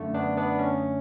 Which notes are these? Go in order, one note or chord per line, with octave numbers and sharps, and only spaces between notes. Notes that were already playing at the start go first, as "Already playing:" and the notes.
Already playing: F#2 D3 A3
B3 D4
B3 D4
C#4